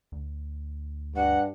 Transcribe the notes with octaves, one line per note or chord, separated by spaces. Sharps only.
D2
G2 F#5